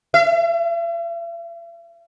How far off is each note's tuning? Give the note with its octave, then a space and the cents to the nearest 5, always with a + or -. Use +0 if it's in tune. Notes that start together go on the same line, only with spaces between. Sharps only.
E5 +45